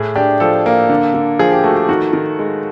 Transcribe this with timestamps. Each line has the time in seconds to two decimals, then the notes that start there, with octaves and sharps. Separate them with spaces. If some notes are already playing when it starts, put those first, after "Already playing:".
Already playing: A2 G#4
0.15 D4 G4
0.40 F3 A4
0.66 A#3
0.89 D3
1.14 D3
1.39 F3 G#4
1.52 G4
1.64 A3 F#4
1.76 G4
1.89 D#3 F#4
2.13 D#3
2.39 G#3